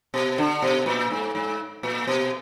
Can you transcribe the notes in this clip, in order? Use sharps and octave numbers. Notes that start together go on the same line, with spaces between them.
B2
D3
B2
A#2
G#2
G#2
A#2
B2